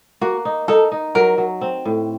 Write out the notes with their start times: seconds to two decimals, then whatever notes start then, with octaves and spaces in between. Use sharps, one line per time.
0.21 A#3 F#4
0.45 D#4
0.68 D#4 A4
0.92 D#4
1.15 F#3 A#4
1.38 F#3
1.61 C4
1.85 A2